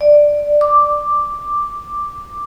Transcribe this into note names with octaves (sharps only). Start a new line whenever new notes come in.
D5
D6